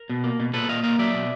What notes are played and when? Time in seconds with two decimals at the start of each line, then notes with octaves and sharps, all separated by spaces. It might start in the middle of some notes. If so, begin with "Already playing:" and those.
Already playing: A#4
0.09 B2
0.24 A#3
0.40 B2
0.54 A#2 A4 B4
0.68 A#2 D#5 F5
0.83 A#3 D#5 F5
0.98 F#3 D5 E5
1.14 B2